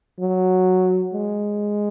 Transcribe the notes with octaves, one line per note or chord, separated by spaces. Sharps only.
F#3
G#3